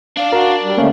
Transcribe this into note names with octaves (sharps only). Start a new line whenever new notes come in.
D4 D5 F5
F#4 A#4
G3
D3 A3 A#3 C#4 F5